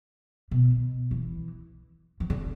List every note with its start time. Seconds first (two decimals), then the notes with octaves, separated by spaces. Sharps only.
0.51 B2
1.11 E3
2.20 E3
2.30 D3